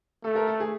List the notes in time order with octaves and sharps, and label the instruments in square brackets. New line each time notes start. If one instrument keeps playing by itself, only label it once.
[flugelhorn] A3 [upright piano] A4
[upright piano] A#4
A4
G#4